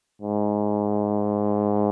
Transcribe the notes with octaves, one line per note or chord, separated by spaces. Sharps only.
G#2